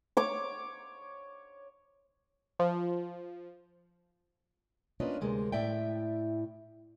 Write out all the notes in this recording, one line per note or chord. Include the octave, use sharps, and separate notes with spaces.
C#5 D6
F3
A#3 C#4 D4 F4 B4 D#5
D2 C3 G#3 A#3
A2 E4 D5 E5 G5